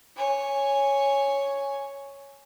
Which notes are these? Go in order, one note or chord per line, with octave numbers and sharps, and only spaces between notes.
C#5 G#5